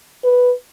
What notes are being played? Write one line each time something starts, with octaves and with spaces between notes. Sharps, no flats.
B4